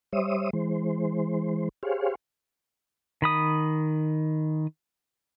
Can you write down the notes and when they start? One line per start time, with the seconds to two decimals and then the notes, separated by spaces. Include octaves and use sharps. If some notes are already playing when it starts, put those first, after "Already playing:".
0.13 G3 C5 C#5 E5 D#6
0.53 E3 G#3 C5
1.83 G4 G#4 C5 C#5 F5
3.22 D#3 B5 D#6